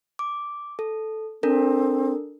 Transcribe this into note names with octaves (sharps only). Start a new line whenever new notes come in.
D6
A4
C4 D4 A4 A#4